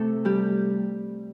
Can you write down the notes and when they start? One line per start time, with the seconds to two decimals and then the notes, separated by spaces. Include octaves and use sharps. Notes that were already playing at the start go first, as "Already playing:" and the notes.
Already playing: C3 A3 A4
0.25 G3 G4